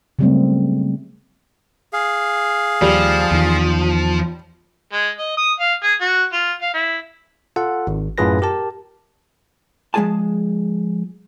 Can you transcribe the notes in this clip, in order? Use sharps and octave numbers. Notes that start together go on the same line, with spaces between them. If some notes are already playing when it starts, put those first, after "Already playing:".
C#3 F#3 G3 A3 A#3 C4
G#4 F5
D#2 F3 G3
E2 D#3
G#3
D#5
D#6
F5
G#4
F#4
F4
F5
E4
F4 A4 F#5
G#1
F#2 A2 F4 G#4 B4 A#6
G4 A#4 A5
F3 G#3 C#4 G#4 G#5 A5